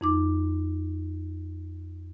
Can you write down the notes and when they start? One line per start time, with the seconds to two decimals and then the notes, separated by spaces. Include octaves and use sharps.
0.01 F2 D#4 D6